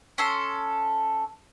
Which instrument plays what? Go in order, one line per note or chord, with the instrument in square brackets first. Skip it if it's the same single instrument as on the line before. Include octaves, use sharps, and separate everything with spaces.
[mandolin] C#4 A4 C6